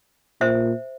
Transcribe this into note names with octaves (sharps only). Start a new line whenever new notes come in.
A#2 C5 E5